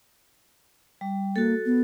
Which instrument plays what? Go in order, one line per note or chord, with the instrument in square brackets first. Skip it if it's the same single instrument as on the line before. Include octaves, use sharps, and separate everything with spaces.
[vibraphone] G3
[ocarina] A#3 [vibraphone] F#4 A4
[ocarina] B3